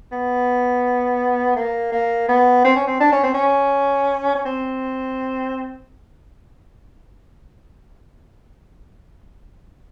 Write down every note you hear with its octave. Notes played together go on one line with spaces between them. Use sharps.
B3
A#3
A#3
B3
C4
C#4
C4
D4
C#4
C4
C#4
C#4
C4